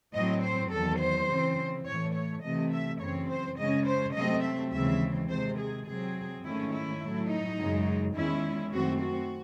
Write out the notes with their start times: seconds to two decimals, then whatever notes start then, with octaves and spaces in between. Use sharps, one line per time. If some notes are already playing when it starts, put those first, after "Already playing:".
0.14 A2 F#3 C4 D#5
0.43 C5
0.72 E2 D#3 F#3 A4
1.00 C5
1.29 C#3 E3 C4
1.86 A2 E3 A3 C#5
2.15 C#5
2.44 C3 E3 A3 D#5
2.72 E5
3.01 F#2 C#3 E3 C4 C#5
3.29 C5
3.58 C#3 G#3 C#4 D#5
3.86 C5
4.15 C3 F#3 A3 C4 D#5
4.43 E5
4.72 D#2 C#3 E3 G#3 C4 E5
5.29 C3 D#3 G#3 C5
5.58 G#4
5.86 C3 F#3 C4 G#4
6.44 G#2 D#3 A3 C#4 E4
6.72 E4
7.01 A2 F#3 A3
7.30 D#4
7.58 F#2 C#3 G#3
8.15 E2 D#3 G#3 C#4 E4
8.73 F#2 D#3 A3 C4 F#4
9.02 F#4